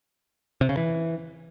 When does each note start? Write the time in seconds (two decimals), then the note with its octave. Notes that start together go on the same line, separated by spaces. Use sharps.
0.61 C3
0.69 C#3
0.77 E3